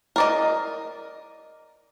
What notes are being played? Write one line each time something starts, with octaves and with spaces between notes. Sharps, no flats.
A#4 D5 D#5